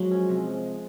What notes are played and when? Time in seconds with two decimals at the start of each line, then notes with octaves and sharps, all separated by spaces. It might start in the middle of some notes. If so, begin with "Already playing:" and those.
Already playing: F3 F#3 G#3
0.12 C#4
0.29 C3